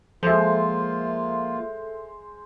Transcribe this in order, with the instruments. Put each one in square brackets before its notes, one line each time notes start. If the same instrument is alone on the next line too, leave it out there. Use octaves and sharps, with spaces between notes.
[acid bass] F3 [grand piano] G#3 C5 [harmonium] A#3 F4 [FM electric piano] A4 E5